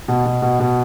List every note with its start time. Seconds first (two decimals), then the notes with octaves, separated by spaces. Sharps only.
0.08 B2
0.25 B2
0.42 B2
0.60 B2